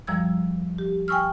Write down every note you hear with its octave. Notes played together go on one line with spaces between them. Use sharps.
F#2 F3 G3 E6 G#6
G4
G5 G#5 C#6 E6 F6